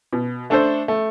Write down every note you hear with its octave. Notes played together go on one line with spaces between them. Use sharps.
B2
A3 D4 A4 C5
A3